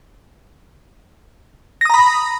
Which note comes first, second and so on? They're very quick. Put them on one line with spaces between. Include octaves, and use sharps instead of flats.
A#6 D#6 A#5 B5